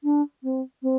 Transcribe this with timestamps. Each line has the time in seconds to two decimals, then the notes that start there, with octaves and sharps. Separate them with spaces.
0.04 D4
0.43 C4
0.83 C4